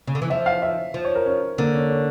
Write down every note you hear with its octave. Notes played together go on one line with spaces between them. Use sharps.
C#3
D3
E3
F3 E5
F5
E5
F3
C#5
A#4
C#4
D3 A#3
C#4
C#4